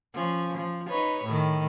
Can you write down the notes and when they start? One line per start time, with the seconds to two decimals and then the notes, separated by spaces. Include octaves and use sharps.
0.14 F3 C#4
0.57 F3
0.88 D#4 B4 C#5
1.24 A2 D#3